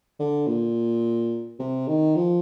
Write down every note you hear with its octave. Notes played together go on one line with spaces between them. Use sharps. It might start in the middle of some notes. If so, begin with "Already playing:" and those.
D3
A#2
C3
D#3
F3